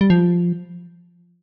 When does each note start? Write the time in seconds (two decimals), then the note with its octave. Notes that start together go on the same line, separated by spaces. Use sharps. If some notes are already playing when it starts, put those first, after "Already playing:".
0.01 G3
0.10 F3